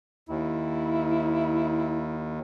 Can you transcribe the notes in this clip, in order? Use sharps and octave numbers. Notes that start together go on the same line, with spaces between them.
D#2 E4